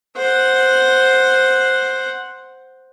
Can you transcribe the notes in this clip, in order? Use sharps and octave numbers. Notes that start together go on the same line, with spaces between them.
C5 F#5